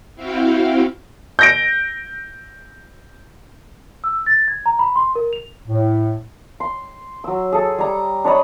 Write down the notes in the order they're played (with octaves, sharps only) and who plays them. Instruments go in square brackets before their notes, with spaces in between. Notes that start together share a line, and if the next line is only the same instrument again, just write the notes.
[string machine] C4 E4 F#4 F5 G5
[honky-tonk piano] G6 A#6 D7
[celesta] E6
A6
G#6
A#5
B5
C6
A#4
F7
[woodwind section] A2
[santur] C6
F#3 E6
G#4 A4
G3 A#5
D4 C#5 D#5 B5